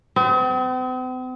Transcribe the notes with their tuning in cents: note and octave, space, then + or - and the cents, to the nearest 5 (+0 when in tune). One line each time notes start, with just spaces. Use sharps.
C4 -45